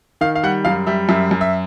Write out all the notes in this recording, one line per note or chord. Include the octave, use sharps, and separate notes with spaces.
D#3 F5
F5
G3 F#5
F#2 F5
G3 E5
F#2 E5
F#2
E5